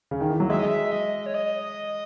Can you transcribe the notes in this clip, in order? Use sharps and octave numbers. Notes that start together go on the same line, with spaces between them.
C#3
D#3
E3
F#3
G#3 E5
D#5
E5
D#5
C#5
D#5